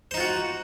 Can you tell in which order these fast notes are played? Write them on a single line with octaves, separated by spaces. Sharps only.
C5 D#4 F4 F#4